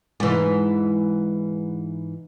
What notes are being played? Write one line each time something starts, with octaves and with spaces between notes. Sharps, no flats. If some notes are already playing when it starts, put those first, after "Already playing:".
G#2 E3